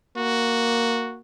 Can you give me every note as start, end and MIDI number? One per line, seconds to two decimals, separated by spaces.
0.17 1.21 58
0.17 1.19 66